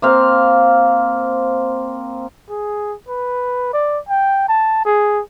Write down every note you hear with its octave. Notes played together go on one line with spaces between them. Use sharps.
A#3 C4 F5
G#4
B4
D5
G5
A5
G#4